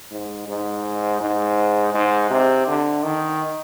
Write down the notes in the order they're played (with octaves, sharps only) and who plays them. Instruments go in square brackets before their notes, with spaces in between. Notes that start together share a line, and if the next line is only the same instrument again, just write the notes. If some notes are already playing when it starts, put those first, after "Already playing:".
[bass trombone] G#2
G#2
G#2
G#2
C3
D3
D#3